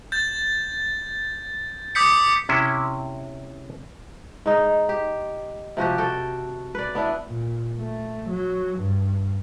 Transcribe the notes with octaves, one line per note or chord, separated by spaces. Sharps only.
G6 A6
D6 D#6 G6 B6 C#7
C3 C#4 E4
G#2 D#4
G4
C3 F3 F#4 G4
F#4 A4 G5
B4 D5
B3 D4 E4
A#2
A3
F#3
G2